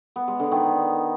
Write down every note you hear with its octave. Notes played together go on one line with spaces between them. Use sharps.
B3
G#3
D3
D#3